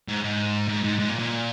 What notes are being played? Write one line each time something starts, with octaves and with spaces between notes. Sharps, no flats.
G#2
G#2
G#2
G#2
G#2
A#2
A#2